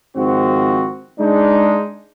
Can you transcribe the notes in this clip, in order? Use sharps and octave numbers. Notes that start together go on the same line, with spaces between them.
G#2 D#3 F3 C4 F#4
G#3 D4 D#4